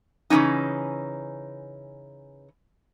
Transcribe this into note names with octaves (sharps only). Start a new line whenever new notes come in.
C#3 E3 F3 C#4 D#4